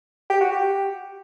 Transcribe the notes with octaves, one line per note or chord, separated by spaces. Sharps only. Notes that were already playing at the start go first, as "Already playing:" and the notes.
G4
F#4
G4